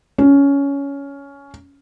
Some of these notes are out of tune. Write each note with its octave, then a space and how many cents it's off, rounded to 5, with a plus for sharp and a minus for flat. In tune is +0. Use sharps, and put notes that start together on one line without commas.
C#4 +15